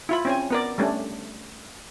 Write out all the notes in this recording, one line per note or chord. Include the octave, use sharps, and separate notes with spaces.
E4 F4 B5
C4 C#4 G#5
B3 A#4 D5
G3 A3 C#4 D4